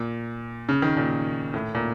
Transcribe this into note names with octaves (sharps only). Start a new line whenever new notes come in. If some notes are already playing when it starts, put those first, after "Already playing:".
Already playing: A#2
C#3
D#3
A#2
A2
A#2